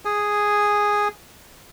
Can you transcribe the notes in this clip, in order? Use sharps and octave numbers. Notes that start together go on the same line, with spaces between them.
G#4 G#5